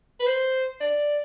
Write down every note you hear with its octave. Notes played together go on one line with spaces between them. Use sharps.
B4
C5
D5